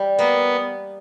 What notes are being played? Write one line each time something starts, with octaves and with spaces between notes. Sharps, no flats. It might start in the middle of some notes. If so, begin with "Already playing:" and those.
Already playing: G3
A#3 B3